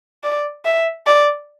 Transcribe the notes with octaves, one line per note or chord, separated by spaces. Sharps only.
D5
E5
D5